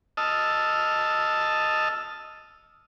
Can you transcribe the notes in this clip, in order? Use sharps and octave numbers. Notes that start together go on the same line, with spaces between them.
D#5 A5 E6 F6